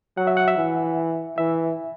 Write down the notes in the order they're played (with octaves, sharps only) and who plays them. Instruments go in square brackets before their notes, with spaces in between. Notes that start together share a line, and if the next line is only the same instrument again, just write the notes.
[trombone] F#3 [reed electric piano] F#5
[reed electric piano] E5
F#5
E5
[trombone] E3
[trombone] E3 [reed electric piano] E5